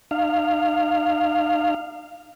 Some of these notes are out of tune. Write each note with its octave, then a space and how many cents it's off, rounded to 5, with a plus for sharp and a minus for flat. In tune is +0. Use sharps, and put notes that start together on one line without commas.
D#4 -40 F5 -5